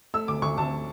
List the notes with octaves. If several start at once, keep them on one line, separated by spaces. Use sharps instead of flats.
A3 E6
D2 D6
D2 C#6
D2 A5